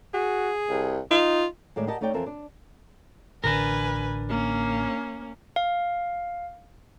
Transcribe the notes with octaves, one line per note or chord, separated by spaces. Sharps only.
F#4 G#4
C2
D#4 F4
A2 D#3 G#3 G#4 D5 E5
G4 A#4 D5 D#5 F#5 A5
A3 D#4 C#5 D5 G5
F2 E3 C4 A4 A#4 E5
D4
A1 D3 D4 A#4 B4 G#5
A#3 C#4
F5